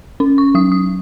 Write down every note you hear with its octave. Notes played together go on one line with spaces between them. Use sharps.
C#4
C#6
F#3 D#6
D#6